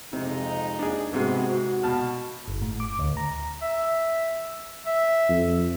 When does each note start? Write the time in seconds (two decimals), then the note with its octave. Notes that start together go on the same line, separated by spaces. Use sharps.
0.13 F2 C3 G#3 D#4
0.79 D4 G#4
1.13 G#2 C3 G#3 B3 C4 F#4
1.47 F#4
1.83 B2 A5 F6
2.48 G1
2.62 A2
2.80 D6
2.99 D2
3.17 A#5
3.62 E5
4.87 E5
5.29 F2